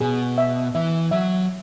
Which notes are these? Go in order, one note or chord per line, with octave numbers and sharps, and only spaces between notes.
B2 G#4
E5
E3 E5
F#3 E5